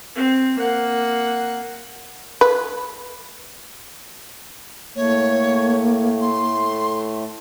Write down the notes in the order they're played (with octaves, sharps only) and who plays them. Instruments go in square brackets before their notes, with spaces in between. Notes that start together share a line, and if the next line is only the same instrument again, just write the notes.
[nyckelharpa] C4
A#3 F#5
[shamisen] B4
[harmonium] A2 A3 [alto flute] A#3 [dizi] C#5
[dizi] C6